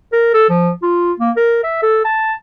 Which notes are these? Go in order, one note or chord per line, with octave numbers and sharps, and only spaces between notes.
A#4
A4
F3
F4
A#3
A#4
E5
A4
A5